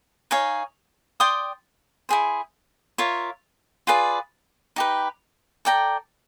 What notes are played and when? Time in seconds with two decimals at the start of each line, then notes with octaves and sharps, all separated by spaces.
0.31 D#4 G#4 C#5 F5
1.20 D5 G5 C6 D#6
2.09 E4 G#4 C5
2.98 F4 A#4 C#5 E5
3.87 F4 G#4 B4 D5
4.76 D#4 G4 B4
5.65 A4 D5 G5 A#5